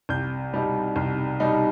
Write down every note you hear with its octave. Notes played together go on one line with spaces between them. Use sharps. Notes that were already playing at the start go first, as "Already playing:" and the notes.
C2 G6
B2 G3 D#4
C2
B2 G3 D#4